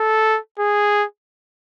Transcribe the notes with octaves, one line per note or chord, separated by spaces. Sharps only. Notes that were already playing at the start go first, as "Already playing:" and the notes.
Already playing: A4
G#4